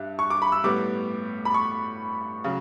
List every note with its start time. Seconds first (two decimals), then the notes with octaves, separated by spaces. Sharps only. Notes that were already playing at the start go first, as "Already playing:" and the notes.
Already playing: G2 E5
0.19 C#6
0.30 D6
0.42 B5
0.52 E6
0.64 A2 G3 B3 D6
1.45 B5
1.54 C#6
2.44 C#3 F#3